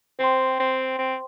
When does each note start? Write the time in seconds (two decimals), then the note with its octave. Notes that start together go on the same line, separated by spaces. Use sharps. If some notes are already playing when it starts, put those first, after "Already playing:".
0.19 C4 C5 G5 C6
0.60 C4
0.98 C4